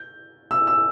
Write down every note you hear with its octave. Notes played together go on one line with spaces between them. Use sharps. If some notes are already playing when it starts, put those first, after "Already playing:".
Already playing: G6
E6
E6